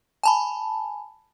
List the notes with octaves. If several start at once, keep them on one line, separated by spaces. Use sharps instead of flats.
G#5 A5 B5